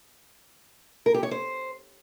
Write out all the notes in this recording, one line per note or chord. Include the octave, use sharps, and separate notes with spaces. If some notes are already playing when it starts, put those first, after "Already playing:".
A#4
G4
C#5
C5